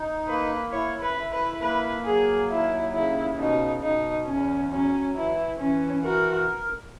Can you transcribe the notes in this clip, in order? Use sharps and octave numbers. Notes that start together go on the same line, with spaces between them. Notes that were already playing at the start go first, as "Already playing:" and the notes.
Already playing: D#4
A#3 B4
E4 C#5
B4
E4
B4
A#3 B4
F#3 G#4
D#2 E4
C#3 E4
B2 D#4
B2 D#4
E2 C#4
F#3 C#4
E3 E4
E3 C#4
F#4 A#4